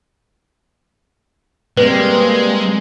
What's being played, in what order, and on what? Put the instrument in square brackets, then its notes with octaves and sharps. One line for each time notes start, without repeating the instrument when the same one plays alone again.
[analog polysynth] G3 A#3 C4 [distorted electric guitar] G#3 [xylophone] B4